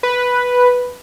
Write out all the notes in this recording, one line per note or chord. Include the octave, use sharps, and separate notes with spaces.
B4